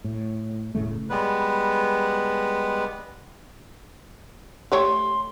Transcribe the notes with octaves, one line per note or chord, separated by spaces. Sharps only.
A2
E1 A2 C#3 A3
G3 G#3 B3 B4
A3 G4 C#5 C6